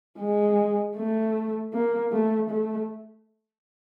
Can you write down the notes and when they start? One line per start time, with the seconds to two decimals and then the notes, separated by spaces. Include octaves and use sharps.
0.19 G#3
0.97 A3
1.73 A#3
2.12 A3
2.50 A3